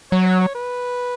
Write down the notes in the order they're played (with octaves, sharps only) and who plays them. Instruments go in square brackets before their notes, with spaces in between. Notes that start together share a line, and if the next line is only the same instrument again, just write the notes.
[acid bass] F#3 [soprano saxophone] C#5
[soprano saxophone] C#5
C#5
B4